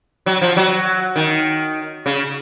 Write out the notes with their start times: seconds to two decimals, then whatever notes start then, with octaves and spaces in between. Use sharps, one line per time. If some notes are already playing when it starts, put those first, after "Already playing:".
0.26 F#3
0.41 F3
0.57 F#3
1.16 D#3
2.06 C#3